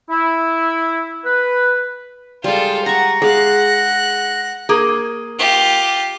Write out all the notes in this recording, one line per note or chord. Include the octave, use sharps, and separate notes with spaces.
E4
B4
G3 G#3 F4 A4 G6
F#5 A#5 C#6 A#6
G#3 G#4 F5 F#5 F#6
A#3 G#4
F4 G4